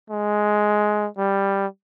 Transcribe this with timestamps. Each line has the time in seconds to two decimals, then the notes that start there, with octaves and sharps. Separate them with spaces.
0.10 G#3
1.18 G3